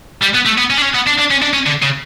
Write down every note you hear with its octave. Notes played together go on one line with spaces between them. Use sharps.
G3
B3
A3
B3
C#4
D4
C#4
B3
D4
D4
C#4
D4
C#4
D3
C#3